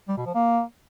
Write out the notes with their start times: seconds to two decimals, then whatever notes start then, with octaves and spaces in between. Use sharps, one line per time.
0.09 G3
0.17 B2
0.26 F3
0.35 A#3